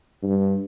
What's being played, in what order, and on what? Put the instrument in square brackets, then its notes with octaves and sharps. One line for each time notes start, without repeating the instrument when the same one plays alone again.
[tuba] G2